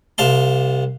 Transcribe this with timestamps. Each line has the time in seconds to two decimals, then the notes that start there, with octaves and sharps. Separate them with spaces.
0.18 C2 F5 A5 C6